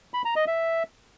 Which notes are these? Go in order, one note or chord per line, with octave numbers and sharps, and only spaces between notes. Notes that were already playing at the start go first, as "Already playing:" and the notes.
B5
A#5
D#5
E5